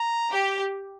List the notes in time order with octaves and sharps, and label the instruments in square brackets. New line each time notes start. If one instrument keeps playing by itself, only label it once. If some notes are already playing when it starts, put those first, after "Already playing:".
Already playing: [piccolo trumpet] A#5
[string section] G4